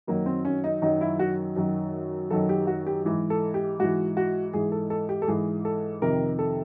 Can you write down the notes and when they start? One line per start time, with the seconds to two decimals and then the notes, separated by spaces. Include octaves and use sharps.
0.07 F#2 D#3 F#3 A#3
0.26 C4
0.45 C#4
0.64 D#4
0.82 F#2 D#3 F#3 D#4
1.01 E4
1.19 F#4
1.56 F#2 D#3 F#3
2.30 F#2 D#3 F#3 A4
2.49 G4
2.67 F#4
2.87 G4
3.05 G#2 E3
3.30 A4
3.54 G4
3.79 G#2 E3 F#4
4.17 F#4
4.53 G#2 E3 G#4
4.72 A4
4.90 A4
5.09 G4
5.22 A4
5.28 G#2 E3 G#4
5.65 A4
6.02 F2 C3 D#3 A#4
6.39 A4